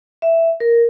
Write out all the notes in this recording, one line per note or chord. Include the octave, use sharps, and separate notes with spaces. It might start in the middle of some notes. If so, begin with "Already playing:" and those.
E5
A#4